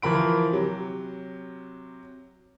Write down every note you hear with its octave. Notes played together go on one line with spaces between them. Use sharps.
E3 F3 A#4 B5 D7
C3 F#3